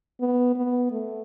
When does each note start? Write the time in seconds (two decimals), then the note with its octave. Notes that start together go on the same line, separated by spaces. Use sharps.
0.20 B3
0.56 B3
0.91 A3